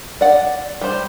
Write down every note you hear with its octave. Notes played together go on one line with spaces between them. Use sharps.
D5 F#5
G3 C5